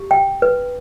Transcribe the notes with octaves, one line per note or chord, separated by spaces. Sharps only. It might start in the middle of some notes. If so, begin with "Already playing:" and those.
Already playing: G4
G5
B4